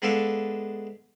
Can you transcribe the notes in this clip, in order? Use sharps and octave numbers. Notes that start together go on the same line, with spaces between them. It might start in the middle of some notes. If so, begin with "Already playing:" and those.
G#3 B3 D4 A4 E5 F5